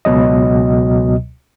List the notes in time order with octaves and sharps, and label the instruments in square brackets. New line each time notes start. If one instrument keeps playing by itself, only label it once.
[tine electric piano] C#2 B2 F#3 D#5